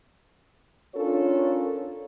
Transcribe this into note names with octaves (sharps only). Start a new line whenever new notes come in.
C#4 D4 F4 A4 A#4 C#5